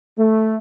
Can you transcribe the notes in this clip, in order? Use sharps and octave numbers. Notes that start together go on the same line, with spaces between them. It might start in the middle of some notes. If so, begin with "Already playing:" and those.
A3